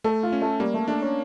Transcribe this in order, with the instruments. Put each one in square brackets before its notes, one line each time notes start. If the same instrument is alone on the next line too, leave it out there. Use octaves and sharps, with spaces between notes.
[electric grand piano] A3 [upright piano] A4
[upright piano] F4
[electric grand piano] C#4
[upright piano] A3
[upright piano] G3 [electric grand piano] A#3
[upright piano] A3
[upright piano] A3 [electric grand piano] D4
[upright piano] C#4